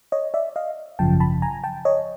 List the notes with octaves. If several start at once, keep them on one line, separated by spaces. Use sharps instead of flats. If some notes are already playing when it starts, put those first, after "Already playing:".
C#5 D#5
D5 E5
D#5 F5
G#1 F#2 C#3 F3 G5 A5
A5 B5
G#5 A#5
G5 A5
C#5 D#5